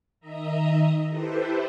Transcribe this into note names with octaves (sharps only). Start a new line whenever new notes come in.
D#3 D#5 E5 A#5
E4 G4 A4 B4 C5